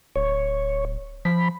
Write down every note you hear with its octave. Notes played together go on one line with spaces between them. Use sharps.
D1 C#5
F3 B5